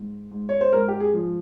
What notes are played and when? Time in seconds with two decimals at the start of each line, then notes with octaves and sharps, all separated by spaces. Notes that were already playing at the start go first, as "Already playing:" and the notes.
Already playing: G#2
0.31 G#2
0.49 C#5
0.61 C5
0.73 G#2 A#4
0.88 G4
1.00 G#4
1.14 F3